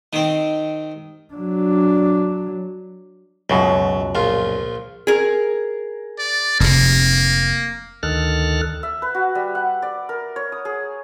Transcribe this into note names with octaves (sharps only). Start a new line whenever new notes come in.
D#3 C4
F#3 D4
C#2 F#2 B2 F#3
A#1 F4
G#4 A#4
D5
F1 C3 A#3
D2 D#3 A4 F6 F#6
E5
B4
F#4
G3
F#5
D5
A#4
C#5
D#6
G#4